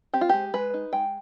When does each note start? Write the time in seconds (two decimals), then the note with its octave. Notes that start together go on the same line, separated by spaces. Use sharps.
0.14 C4 G4
0.21 F4
0.29 G#3 G4
0.54 G#3 B4
0.74 D#4
0.93 G#3 G5